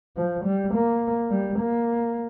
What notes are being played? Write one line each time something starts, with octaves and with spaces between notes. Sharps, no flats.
F3
G3
A#3
G3
A#3